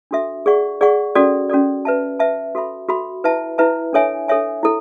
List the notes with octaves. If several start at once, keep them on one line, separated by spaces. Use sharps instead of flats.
D4 F#4 A4 E5
G#4 D5 F#5 C#6
G#4 D5 F#5 C#6
C#4 F#4 A4 D5
C#4 F#4 A4 D5
B4 E5 A5
B4 E5 A5
F#4 A4 E5 B5
F#4 A4 E5 B5
E4 B4 E5 A5
E4 B4 E5 A5
D4 A4 C#5 E5 G#5
D4 A4 C#5 E5 G#5
E4 A4